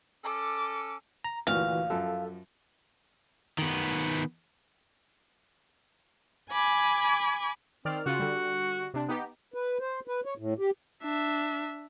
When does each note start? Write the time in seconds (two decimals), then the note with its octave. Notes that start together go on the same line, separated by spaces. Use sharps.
0.24 C#4 A4 D6
1.24 A#5
1.47 D2 A#2 E3 F#4 F5
1.90 F#2 F3 A4
3.58 D#3 B3
6.50 G#5 B5 D6 G#6
7.85 D#3 C4 D5 F6
8.06 C#3 F4 F#4
8.20 D3 G3
8.94 C3 D4
9.08 B3 D#4 G4
9.54 B4
9.80 C5
10.08 B4
10.25 C#5
10.38 A2
10.59 G4
11.03 D4 E5